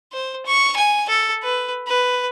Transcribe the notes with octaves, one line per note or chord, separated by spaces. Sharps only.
C5
C#6
G#5
A4
B4
B4